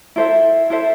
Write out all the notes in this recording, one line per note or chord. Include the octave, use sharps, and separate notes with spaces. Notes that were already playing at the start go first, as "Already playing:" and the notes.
E4 A4 C5 E5
E4 A4 C5 E5